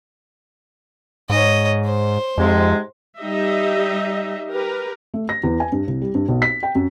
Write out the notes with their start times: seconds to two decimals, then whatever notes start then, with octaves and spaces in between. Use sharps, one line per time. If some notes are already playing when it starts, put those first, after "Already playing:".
1.30 G#2 C#5 D#5
1.85 C5
2.38 F2 G#2 C3 G#3
3.20 G3 D#4 G4 D#5 E5
4.50 G4 A#4 B4
5.14 A3
5.29 A#6
5.44 E2
5.60 G#5
5.72 G2
5.88 C2
6.02 G3
6.15 G2
6.28 B1
6.42 B6
6.63 G5
6.75 F#2